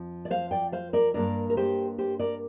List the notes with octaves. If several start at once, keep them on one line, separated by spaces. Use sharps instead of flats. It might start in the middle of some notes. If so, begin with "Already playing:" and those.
Already playing: F2 F3
D5
C5 F5
D5 G5
C5 F5
A#4 D5
G2 D3 A#3 D4 A#4 D5
A#4
G4 C5
G4 C5
A#4 D5